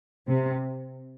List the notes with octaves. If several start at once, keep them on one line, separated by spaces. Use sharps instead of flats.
C3